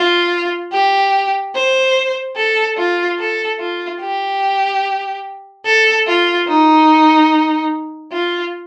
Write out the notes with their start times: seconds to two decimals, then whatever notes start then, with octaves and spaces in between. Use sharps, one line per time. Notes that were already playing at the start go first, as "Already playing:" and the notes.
Already playing: F4
0.72 G4
1.55 C5
2.36 A4
2.78 F4
3.19 A4
3.59 F4
4.01 G4
5.65 A4
6.07 F4
6.48 D#4
8.12 F4